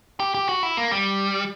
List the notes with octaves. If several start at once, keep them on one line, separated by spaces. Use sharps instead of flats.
G4
G4
F#4
E4
A#3
G3